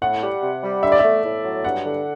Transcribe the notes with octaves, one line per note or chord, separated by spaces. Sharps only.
A2 F#5
G3
C3
G3
D3 E5
D5
A3 E5
A2
F#3
G2 F#5
D3